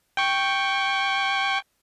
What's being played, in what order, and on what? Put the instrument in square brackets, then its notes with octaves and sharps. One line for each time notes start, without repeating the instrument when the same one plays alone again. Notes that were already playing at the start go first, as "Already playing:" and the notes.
[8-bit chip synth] G5 C#6